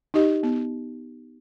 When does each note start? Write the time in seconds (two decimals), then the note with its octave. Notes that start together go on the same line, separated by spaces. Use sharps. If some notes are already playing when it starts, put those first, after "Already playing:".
0.14 D#4 G4 D#5
0.43 B3